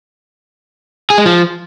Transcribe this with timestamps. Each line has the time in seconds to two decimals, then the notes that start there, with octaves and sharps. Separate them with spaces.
1.10 G#4
1.18 G#3
1.26 F3